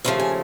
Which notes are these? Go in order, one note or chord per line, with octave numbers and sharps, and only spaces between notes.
D#2 C#3 F3 A3 F5
G#5